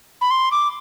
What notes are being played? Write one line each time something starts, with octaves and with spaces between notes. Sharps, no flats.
B5
C6
D6